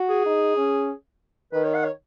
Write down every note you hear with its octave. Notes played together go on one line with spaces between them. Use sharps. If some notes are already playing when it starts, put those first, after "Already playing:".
Already playing: F#4
G#4
D#4
C#4
D#3 B4
C#5
F#5
C#5